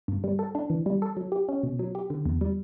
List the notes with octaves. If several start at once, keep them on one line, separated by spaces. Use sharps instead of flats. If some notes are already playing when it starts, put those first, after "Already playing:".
G2
G3
A4
D4
E3
G3
A4
F#3
G4
C#4
B2
F#3
G4
D3
E2
G3